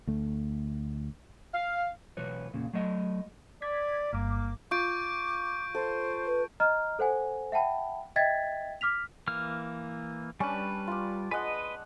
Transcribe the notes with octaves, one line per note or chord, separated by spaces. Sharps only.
D2 A3
F5
B1 E3 B4 C#5
E2 A#2 C#3
F#3 A3 D#5
D5 G#6 B6
G1 G2 A#3 D6
F4 C#6 D6 G6 D7
A4 C5
B4
D#5 A#5 F6
A4 C5 F#5 G#5
E5 F#5 G5 A5 B5
D#5 E5 G5 G#6 A6 B6
D6 F6 B6 F7
E3 A#3 F6
G3 C#4 D4 B4 A5
F4 D6
G#3 B4 D#5 F#5